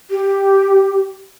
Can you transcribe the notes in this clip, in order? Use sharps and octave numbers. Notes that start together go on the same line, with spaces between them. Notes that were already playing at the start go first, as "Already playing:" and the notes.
G4